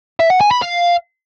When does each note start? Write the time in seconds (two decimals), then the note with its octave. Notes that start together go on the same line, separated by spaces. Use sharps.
0.20 E5
0.30 F#5
0.41 G#5
0.51 B5
0.62 F5